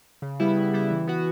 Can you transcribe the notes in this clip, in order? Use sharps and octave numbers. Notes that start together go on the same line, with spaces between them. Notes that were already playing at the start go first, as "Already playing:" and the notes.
C#3
G3 B3 E4
C#3
G3 B3 E4
E3
B3 F#4